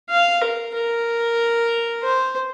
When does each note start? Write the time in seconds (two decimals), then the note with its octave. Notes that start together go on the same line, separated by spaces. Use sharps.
0.10 F5
0.42 A#4
0.74 A#4
2.03 C5